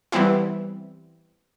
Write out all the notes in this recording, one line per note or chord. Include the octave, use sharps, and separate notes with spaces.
E3 G3 B3 C4 E4